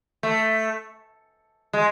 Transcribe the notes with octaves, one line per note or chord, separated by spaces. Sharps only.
A3
G#3